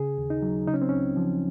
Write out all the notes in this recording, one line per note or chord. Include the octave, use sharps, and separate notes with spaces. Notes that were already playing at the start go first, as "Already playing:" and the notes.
Already playing: C#3 G#4
D#2
D#4
F#3
C#3 D#4
C#4
C4
C#2 C#4
F3